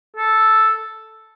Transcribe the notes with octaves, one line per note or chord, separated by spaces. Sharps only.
A4